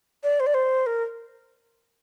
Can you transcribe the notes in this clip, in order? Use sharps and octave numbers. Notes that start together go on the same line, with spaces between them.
D5
C5
D5
C5
A#4